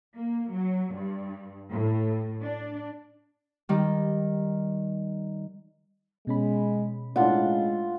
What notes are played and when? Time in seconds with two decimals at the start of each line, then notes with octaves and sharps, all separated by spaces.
0.17 A#3
0.52 F#3
0.96 G2
1.71 A2
2.44 D4
3.69 D#3 G3
6.27 B2 G#3 C#4 B5
7.16 A2 G#3 D4 F4 F#5